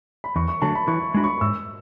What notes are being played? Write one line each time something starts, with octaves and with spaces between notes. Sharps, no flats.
B5
E2 C#6
C#6
D3 F#3 A3 A5
B5
E3 C#6
G#3 D4 F#4 B5
C#6
G#2 E6